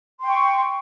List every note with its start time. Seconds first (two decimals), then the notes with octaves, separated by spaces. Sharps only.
0.20 C6
0.23 G5
0.27 C#6